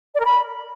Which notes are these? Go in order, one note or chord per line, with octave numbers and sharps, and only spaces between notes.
D5
A#4
B5